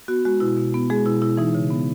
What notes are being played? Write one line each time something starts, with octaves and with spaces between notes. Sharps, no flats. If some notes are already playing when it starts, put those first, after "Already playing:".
B3 F#4
G#3 F#4
B2 E4
B2
B3
G#3 G#4
B2 E4
B2 E4
E3 D#4
C#3
B3